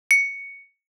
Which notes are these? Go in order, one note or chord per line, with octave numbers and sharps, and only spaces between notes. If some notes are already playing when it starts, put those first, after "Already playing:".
C#7